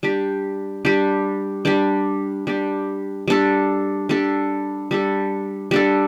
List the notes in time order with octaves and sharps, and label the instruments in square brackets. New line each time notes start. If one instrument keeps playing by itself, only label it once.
[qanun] G3 D4 G4
G3 D4 G4
G3 D4 G4
G3 D4 G4
G3 D4 A4
G3 D4 A4
G3 D4 A4
G3 D4 A4